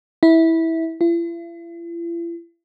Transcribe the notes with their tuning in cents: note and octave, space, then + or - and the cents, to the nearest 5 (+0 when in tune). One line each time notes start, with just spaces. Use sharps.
E4 -15
E4 +45